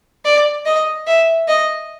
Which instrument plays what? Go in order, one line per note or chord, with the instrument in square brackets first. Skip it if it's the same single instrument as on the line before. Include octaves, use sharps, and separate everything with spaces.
[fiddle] D5
D#5
E5
D#5